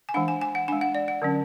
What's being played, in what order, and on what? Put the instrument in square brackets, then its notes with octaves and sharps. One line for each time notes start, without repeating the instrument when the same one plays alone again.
[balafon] G#5
E3 G#3 D4 F#5
G#5
G#5
F#5
D4 G#5
G#3
F#5
D5
F#5
D3 F#3 C#4